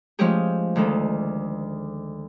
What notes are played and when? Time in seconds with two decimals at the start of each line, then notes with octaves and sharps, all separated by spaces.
0.19 F3 G#3 A3 C#4 G4 G#4
0.76 D2 D#3 G#3 A4